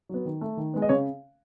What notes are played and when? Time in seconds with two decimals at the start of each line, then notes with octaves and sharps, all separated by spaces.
0.09 F#3 B3
0.25 D#3
0.41 A3
0.57 D#3
0.74 G#3 B3
0.82 D#5
0.89 C#3 C#5